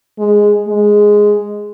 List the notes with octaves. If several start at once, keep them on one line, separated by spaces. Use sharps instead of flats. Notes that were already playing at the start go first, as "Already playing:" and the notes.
G#3
G#3